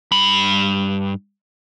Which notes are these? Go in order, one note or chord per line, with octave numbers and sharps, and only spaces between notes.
G2 B5